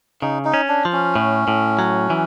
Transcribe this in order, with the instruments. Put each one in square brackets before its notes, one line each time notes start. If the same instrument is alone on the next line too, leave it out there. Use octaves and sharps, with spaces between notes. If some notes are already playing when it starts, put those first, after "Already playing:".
[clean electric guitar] C#3 [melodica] D#4
[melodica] D#4
[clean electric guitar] C#4
[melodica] D4
[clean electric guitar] F3
[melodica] C#4
[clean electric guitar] A2
A2
F#3
E3